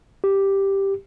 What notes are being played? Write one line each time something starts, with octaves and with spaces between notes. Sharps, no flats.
G4